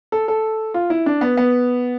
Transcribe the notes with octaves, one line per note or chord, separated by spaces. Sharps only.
A4
A4
F4
E4
D4
B3
B3